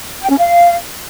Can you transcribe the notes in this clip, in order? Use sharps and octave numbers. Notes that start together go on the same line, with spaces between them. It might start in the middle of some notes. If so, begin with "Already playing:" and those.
G5
C#4
F5